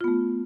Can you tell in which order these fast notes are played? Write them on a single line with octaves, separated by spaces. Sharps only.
F4 B3 A3